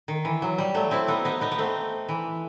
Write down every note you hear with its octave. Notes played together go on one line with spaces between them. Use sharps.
D#3
E3
F#3
G3
F#3 A3
C4 E4
B3 D#4
B3 D#4
B3 D#4
B3
A3 C4
E3